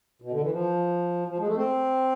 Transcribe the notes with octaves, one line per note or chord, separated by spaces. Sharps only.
B2
D3
E3
F3
F3
G#3
A3
C4